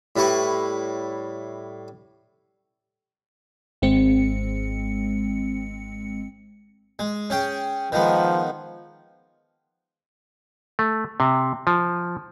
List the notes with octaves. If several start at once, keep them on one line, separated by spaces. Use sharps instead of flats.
A2 G3 E4 B4 C#6
G#1 G#3 C4 C#7
G#3
C#4 G#4 G5
D#3 F3 G#3 B3
A3
C3
F3